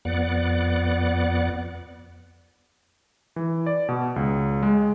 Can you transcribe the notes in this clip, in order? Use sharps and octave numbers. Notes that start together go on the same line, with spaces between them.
F2 B3 D5 F#5
E3
D5
B2
C#2
G#3